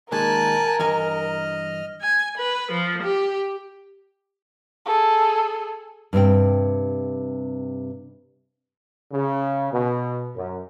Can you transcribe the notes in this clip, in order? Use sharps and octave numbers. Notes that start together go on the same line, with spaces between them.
A#2 D#3 G#3 A#4 G#5 A5 F#6
G2 E3 D#5 G#5 F6
G#5
B4
F3
G4
G#4 A4
G2 C3 C4 G5
C#3
B2
F#2